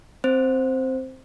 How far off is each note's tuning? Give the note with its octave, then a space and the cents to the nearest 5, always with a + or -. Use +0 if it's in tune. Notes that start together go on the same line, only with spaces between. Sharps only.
C4 +0 C5 +0